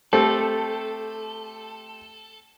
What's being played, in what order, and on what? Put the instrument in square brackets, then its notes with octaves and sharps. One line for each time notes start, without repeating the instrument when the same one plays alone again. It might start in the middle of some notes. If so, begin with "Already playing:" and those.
[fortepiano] A3 C4 G4 [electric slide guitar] A4